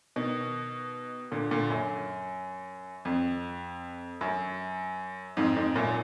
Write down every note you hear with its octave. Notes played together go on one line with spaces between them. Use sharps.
B2 D#3
A#2 D3
A#2 D3
F#2
F2
F#2
F2 G#2
F2 G#2
F#2 A#2